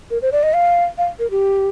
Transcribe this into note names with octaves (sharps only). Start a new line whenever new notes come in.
A#4
C5
D5
D#5
F5
F5
A#4
G4